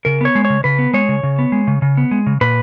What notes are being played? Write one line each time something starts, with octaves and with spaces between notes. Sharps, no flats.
C#3 A#4
B3 C#5
G#3
C#5
C#3
C#3 B4
B3
G#3 C#5
C#3
C#3
B3
G#3
C#3
C#3
B3
G#3
C#3
A#2 B4